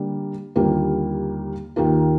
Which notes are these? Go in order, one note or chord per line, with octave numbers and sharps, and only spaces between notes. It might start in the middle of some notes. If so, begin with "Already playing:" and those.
Already playing: D3 G3 A#3 D4
D#2 D3 G3 A#3 F4
D#2 D#3 A#3 F4